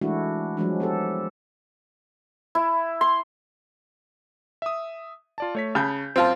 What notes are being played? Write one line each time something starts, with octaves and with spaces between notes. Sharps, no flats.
E3 G#3 A3 D4 E4 F#4
F3 F#3 G#3 D4
B3 G4 A4
E4
C6
E5 D#6
F4 D5 A5
A3 C#5 B6
C#3 A5 B5 G6
F#2 C4 F4 A5